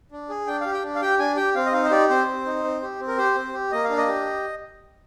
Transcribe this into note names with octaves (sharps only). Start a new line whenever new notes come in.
D4
G#4
D4 G5
F5
G4
G5
D4
F5
G4 G5
D4 G#5
G4 G5
C4 F5
D#5
D#4 F5
C5
G4 D5
C4 C5
C4
D#4
C4
G4
C4
A#4
G4 C5
C4
G4
A#3 D#5
F5
D4
D#5
G4